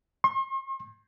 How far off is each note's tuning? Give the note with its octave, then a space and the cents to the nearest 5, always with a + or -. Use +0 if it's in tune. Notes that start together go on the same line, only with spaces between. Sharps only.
C6 +45